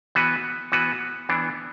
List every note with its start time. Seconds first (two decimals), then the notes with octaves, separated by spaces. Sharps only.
0.15 E3 B3 F#4 B4
0.72 E3 B3 F#4 B4
1.29 E3 B3 D4